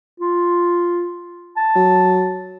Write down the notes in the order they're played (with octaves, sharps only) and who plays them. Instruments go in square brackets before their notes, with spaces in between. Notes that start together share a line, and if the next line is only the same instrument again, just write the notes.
[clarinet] F4
A5
[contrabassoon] F#3